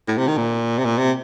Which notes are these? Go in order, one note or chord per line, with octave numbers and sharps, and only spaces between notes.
A2
C3
D#3
A#2
C3
A#2
C3